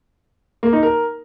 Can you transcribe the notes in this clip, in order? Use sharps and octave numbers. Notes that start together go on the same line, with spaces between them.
A#3
D#4
A#4